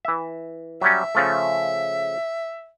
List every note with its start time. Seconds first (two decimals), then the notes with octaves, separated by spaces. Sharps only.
0.05 E3 E5
0.81 F#3 G3 C#4 E5
1.15 C#3 F3 A3